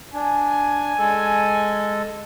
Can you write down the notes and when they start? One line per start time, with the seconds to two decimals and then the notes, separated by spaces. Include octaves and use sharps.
0.14 D4 G#5
0.98 G#3 A4